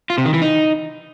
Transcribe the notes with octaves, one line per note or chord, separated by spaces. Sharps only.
F4
C3
D#3
E3
D#4